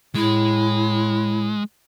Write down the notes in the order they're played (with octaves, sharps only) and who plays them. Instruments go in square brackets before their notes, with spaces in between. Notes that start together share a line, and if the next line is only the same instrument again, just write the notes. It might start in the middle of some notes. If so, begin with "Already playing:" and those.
[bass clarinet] A2 [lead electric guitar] G#3 [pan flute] E4